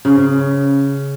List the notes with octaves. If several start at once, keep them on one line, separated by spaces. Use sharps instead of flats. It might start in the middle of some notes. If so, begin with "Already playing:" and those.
C#3